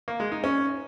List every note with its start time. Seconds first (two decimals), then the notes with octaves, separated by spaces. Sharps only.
0.08 A#3
0.20 G#3
0.32 D#4
0.44 C#4